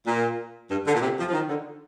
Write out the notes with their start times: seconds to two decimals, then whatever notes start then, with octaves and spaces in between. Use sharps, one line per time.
0.06 A#2
0.69 G2
0.86 D3
0.94 A#2
1.01 C3
1.18 F3
1.28 F3
1.33 D#3
1.48 D3